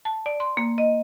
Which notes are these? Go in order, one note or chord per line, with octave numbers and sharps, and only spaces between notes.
A5
D5
C6
A#3
D#5